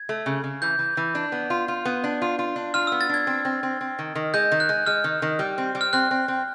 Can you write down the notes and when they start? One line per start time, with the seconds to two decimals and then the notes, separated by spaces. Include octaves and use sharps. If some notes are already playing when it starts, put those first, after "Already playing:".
Already playing: G#6
0.09 A3
0.26 C#3
0.44 C#3
0.62 E3 G6
0.79 E3
0.97 E3
1.15 D4
1.32 B3
1.50 F4
1.68 F4
1.85 B3
2.04 D4
2.22 F4
2.39 F4
2.56 D4
2.74 F4 F6
2.87 E6
2.92 B3
3.01 A6
3.09 D4 G#6
3.27 C4
3.45 C4
3.63 C4
3.81 C4
3.99 D#3
4.15 D#3
4.34 G#3 G6
4.52 D#3
4.60 F#6
4.69 G#3
4.86 G#3 F6
5.04 D#3
5.22 D#3
5.39 G3
5.58 C4
5.75 G3
5.81 F6
5.93 C4 F#6
6.11 C4
6.28 C4